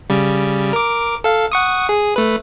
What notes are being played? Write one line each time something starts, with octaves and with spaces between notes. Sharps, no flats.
C#3 G3
A#4 D6
A4 F5
F#5 C#6 D#6
G#4
A3 B4